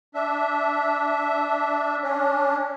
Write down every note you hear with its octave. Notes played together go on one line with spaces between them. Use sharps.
D4 E5
C#4 D4